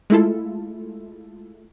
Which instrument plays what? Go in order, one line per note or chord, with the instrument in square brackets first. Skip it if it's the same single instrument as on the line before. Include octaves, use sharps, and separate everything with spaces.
[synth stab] G#3 A3 E4 F4 A4